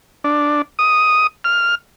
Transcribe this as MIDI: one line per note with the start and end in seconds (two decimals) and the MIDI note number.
0.24 0.62 62
0.79 1.27 87
1.44 1.75 89